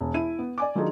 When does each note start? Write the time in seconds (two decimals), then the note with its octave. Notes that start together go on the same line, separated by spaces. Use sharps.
0.01 E1
0.14 E4 D#7
0.39 B3
0.58 D5 G#5 D6
0.75 D#3 F#3 D4 D#4 F4 G#4